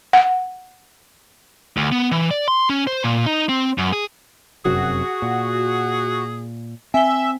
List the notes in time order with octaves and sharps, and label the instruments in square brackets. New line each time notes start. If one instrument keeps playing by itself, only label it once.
[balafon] F#5
[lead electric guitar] D2
B3
E3
D5
C6
C#4
C5
A#2
D#4
C4
F#2
G#4
[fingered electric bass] F1 F#2 C3 [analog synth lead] F#4 [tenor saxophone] G#4
[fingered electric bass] A#2
[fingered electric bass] C4 [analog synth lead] E5 [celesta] G#5 G7